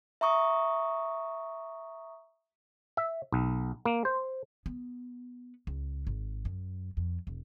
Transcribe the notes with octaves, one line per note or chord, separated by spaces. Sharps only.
E5 A#5 C#6 D#6
E5
B1
A#3
C5
B3
C#2
G#1
F#2
F2
E1